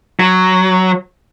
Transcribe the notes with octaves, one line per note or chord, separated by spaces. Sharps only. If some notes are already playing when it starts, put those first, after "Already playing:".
F#3